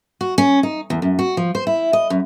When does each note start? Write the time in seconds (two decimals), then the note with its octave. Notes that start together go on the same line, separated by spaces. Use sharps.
0.21 F#4
0.38 C#4
0.63 D#4
0.90 E2
1.02 F#2
1.19 F#4
1.37 F3
1.55 C5
1.67 E4
1.93 D#5
2.10 F#2